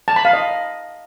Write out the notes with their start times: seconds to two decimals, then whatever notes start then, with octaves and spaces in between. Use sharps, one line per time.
0.08 A5
0.16 B5
0.25 F5
0.33 D#5